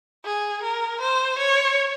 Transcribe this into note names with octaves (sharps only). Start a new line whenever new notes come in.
G#4
A#4
C5
C#5